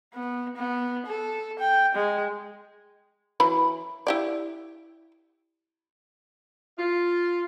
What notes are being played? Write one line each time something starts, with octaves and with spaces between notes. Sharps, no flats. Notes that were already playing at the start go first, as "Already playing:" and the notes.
B3
B3
A4
G5
G#3
E3 F#3 B5
E4 G4 D5
F4